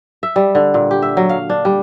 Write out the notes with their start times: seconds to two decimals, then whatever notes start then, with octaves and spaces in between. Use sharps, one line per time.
0.23 E5
0.36 G3
0.55 D3
0.74 A#2
0.91 G4
1.02 E5
1.17 F#3
1.29 F5
1.50 D4
1.65 G3